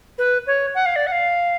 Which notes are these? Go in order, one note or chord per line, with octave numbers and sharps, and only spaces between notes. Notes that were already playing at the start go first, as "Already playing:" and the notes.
B4
C#5
F#5
F5
D5
F#5
F5